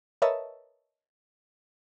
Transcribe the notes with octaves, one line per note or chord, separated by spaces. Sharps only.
A#4 B4 C#5 D#5 E5 A5